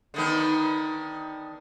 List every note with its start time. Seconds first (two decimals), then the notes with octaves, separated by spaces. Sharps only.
0.14 D3 D#3 B3